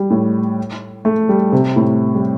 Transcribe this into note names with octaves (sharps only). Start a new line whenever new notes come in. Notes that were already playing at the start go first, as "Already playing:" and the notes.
Already playing: G3
A2
A3
G3
C3
A2
G3